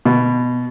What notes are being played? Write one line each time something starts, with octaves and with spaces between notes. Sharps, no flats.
B2